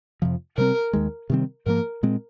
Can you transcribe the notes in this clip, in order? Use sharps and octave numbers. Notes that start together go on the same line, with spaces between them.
F2 C3 F3
C3 G3 C4 A#4
D#2 D#3 G#3
C3 D#3 G3 C4
G#2 F3 A#3 A#4
A#2 G#3 C4